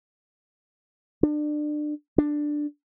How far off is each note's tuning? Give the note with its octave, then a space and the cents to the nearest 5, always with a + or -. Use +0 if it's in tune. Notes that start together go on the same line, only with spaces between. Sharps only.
D4 +30
D4 +5